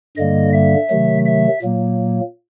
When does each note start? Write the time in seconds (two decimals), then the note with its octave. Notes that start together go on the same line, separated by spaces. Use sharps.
0.17 G2 D3 G3 A#3 D#5
0.53 E5
0.90 C3 D#3 F#3 A3
1.25 E5
1.62 A#2 F#3 A#3